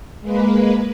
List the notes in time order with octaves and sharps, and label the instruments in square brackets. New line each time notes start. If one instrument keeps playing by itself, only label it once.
[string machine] G#3 A#3 B4